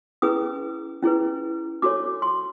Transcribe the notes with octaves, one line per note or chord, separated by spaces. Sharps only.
C#4 E4 G#4 B4 D#6
C#4 E4 G#4 B4
D4 F#4 A4 C#5 D6
C6